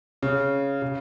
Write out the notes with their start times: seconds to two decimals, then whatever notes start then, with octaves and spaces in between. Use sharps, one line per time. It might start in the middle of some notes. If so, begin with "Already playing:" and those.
0.23 C#3
0.82 C#3